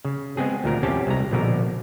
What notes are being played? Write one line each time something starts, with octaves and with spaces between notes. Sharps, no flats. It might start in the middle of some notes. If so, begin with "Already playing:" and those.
C#3
G#3 B3 C4 G#4
D2 A#2 A#4
E2 C4 C#4 G4 A5
C2 G#3 A#5
A#1 B2 D3 A#4